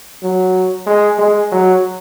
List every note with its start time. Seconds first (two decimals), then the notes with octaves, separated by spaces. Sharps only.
0.22 F#3
0.86 G#3
1.19 G#3
1.52 F#3